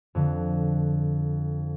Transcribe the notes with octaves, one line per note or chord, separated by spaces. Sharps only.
F2 D3